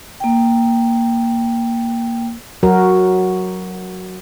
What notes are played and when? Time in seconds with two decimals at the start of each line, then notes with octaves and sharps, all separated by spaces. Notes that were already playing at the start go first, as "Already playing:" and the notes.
0.20 A#3 G5
2.63 F#3 F#4 A#4